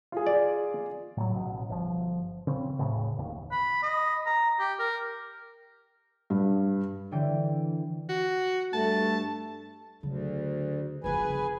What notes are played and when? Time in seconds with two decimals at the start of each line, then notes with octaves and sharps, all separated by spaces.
0.12 F4 G#4
0.27 D5
1.17 A2 F#3
1.34 A1 B2
1.70 G1 F3
2.47 C#3 C4
2.79 E1 A2 C#3
3.16 E1 D#2
3.52 B5
3.83 D#5
4.26 A#5
4.59 G4
4.79 A#4
6.30 G2
7.11 D3 E3 G5
8.09 F#4
8.73 G2 A3 A5
10.03 D2 C#3 F#3
11.04 G1 F3 G#4 B4 G#5